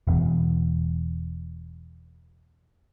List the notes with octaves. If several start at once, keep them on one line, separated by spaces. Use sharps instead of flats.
E1 E2